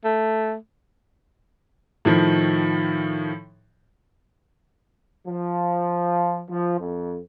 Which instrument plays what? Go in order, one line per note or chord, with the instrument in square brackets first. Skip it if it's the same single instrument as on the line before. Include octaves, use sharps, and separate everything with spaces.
[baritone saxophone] A3
[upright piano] A2 D#3 F3
[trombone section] F3
F3
F2